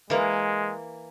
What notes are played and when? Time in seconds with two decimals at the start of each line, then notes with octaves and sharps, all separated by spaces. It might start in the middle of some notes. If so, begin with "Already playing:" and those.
0.10 E3 G#3 A#3